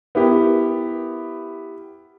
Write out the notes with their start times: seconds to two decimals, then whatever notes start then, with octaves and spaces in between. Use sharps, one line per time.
0.15 B3 E4 G4 A#4